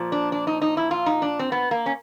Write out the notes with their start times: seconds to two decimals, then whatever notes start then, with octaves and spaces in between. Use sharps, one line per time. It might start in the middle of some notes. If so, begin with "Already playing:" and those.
Already playing: A#2 F3
0.12 D4
0.32 D4
0.47 D#4
0.62 D#4
0.77 E4
0.91 F4
1.06 D#4
1.22 D4
1.39 C4
1.52 B3
1.71 A#3
1.86 C#4